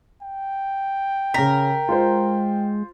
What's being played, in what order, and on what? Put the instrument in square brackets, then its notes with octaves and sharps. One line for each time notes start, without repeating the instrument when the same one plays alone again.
[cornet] G5
[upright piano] C#3 B6 [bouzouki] A#4
[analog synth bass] G#3 [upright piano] F4 C5